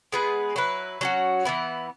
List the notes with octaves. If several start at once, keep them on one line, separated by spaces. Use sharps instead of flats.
G#3 B3 G#4 B4
F#3 E4 B4
F#3 C#4 F#4
E3 B3 E4